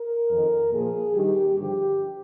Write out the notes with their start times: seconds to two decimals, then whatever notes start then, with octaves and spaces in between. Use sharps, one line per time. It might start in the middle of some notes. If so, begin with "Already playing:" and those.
Already playing: A#4
0.30 F2 D#3
0.72 A#2 F3 G#4
1.14 G2 D#3 G4
1.57 G2 D3 F3 G4